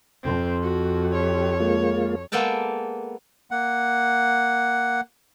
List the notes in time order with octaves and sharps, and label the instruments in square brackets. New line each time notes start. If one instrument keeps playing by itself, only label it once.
[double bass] F2 [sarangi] C4
[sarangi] F#4
[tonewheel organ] G4 [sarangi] C#5
[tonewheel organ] G#3 A#3 F4
[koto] G#3 A#3 B3 A4 G5 A5
[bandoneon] A#3 F#5